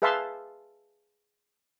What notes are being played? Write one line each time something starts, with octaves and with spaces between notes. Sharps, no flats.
G#4 B4 E5 F5 A5 C6